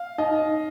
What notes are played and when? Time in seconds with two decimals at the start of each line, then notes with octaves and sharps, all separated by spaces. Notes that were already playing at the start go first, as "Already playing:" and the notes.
Already playing: F5
0.18 D#4 D#5